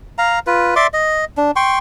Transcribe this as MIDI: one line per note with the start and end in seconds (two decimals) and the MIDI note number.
0.18 0.39 77
0.18 0.39 82
0.47 0.75 65
0.47 0.75 71
0.76 0.87 74
0.76 0.87 76
0.76 0.87 84
0.76 0.87 86
0.93 1.25 75
1.37 1.51 62
1.56 1.79 79
1.56 1.79 84
1.56 1.79 85